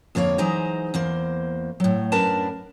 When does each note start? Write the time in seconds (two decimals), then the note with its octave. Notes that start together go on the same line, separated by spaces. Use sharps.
0.15 F2 D3 A#3 C#5 F5
0.38 E3 F#3 G#3 D#4 C5 A#5
0.94 E2 A#3 C5
1.80 A2 F#3
2.12 F#2 D4 E4 A#4 B4 A5